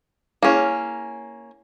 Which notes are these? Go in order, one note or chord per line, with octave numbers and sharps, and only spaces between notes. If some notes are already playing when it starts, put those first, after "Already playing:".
A#3 C#4 E4 G#4 C#5